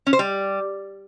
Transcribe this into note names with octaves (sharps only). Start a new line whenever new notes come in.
C#4
C5
G3